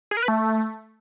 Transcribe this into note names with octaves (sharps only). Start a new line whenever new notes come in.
G#4
A#4
B4
A3